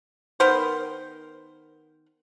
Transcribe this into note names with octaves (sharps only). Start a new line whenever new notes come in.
D#3 B3 A#4 C5